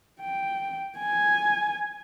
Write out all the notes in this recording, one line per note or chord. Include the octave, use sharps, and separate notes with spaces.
G5
G#5